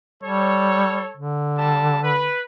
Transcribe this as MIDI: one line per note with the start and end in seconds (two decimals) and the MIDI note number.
0.23 1.08 55
0.23 1.17 69
0.23 1.17 73
1.17 2.32 50
1.57 1.99 55
1.57 1.99 81
2.03 2.42 71